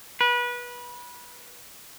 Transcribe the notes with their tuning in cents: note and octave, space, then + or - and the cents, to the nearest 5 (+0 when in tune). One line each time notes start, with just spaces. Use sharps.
B4 -25